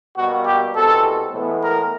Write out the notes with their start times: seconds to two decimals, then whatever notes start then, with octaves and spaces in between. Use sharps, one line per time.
0.17 B2 G3 A#3 F#4
0.46 G4
0.75 C2 B2 G#3 C4 A4
1.33 A2 E3 G#3 B3
1.62 A#4